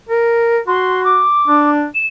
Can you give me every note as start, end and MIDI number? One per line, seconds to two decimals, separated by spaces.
0.09 0.59 70
0.67 1.24 66
0.67 1.01 84
1.04 1.69 86
1.48 1.86 62
1.95 2.07 100